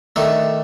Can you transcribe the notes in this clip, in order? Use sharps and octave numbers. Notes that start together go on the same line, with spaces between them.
D#3 A3 D4 A4